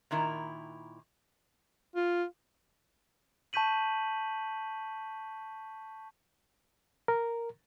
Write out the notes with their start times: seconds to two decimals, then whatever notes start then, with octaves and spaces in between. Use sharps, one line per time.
0.11 A#2 D#3 E4 A#4
1.95 F4
3.53 A5 C#6 G6 B6 D#7 F#7
7.08 A#4